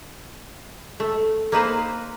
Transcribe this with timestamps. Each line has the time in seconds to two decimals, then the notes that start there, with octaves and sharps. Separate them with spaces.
1.00 A3
1.52 A#3 D#4 B4 C5